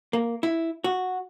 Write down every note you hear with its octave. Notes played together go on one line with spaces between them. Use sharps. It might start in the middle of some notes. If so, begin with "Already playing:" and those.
A#3
E4
F#4